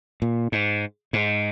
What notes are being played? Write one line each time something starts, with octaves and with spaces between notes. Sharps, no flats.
A#2
G#2
G#2